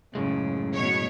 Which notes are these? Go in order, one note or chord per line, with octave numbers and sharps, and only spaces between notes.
F#2 A2 C#3 G#3
B2 C#5